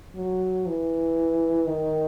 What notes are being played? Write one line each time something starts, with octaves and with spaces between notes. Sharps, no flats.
F#3
E3
D#3